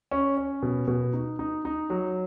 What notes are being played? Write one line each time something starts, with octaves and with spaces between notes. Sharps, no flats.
C#4
C#4
B2
B2
D#4
D#4
D#4
F#3